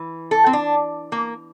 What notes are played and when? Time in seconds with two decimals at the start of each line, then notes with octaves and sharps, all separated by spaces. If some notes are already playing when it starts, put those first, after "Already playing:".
Already playing: E3
0.31 A4
0.46 C4
0.53 D4
1.12 A#3